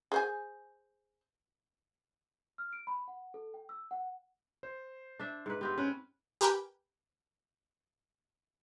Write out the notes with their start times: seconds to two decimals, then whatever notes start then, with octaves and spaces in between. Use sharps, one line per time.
0.12 G#4 C5 G#5
2.58 F6
2.73 D7
2.87 B5
3.08 F#5
3.34 A4
3.54 G5
3.69 E6
3.91 F#5
4.63 C5
5.19 D4 E5
5.46 G#2 B4
5.61 B3 C4 G4 B4
5.78 C4 C#4 B4
6.41 G4 A#4 B4 G5 G#5